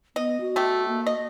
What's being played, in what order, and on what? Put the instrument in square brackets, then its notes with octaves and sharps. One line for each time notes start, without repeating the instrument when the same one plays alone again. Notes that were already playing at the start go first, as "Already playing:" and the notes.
[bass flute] B3 [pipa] D#5
[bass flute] F#4
[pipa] A3 G4
[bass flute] A#3
[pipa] D#5